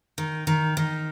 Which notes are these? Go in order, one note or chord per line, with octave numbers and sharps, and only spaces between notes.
D#3
D#3
D#3